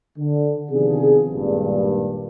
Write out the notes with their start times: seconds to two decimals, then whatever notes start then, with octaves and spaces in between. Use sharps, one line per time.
0.18 D3
0.71 C3 D#3 F3 B3 D4 G#4
1.30 G#1 G2 A#2